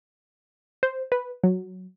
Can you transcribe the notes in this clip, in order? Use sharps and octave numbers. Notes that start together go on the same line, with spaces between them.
C5
B4
F#3